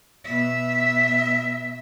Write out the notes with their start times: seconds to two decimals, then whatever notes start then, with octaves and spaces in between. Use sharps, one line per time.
0.24 B2 E5